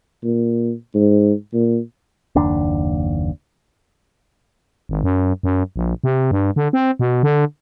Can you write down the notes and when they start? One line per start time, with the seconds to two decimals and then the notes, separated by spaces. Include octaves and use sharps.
0.24 A#2
0.95 G#2
1.54 A#2
2.35 F#1 D#2 D4
4.89 G#1
5.03 F#2
5.43 F#2
5.76 A#1
6.04 C3
6.31 G2
6.56 D3
6.73 C4
6.99 B2
7.23 D3